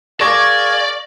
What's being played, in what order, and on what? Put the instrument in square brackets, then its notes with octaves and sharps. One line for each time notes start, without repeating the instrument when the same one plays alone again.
[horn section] G#4 A#4 F5 [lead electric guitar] D5 [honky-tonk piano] C#6 A#6 [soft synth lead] G#6